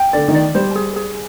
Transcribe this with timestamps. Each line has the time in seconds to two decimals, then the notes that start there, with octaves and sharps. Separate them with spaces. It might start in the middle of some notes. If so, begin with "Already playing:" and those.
Already playing: G5
0.13 D3 D5
0.28 D#3
0.34 D5
0.55 G3 C5
0.75 G#4
0.96 G#4